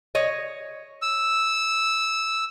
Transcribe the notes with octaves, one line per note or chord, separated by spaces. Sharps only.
C#5 D#5
E6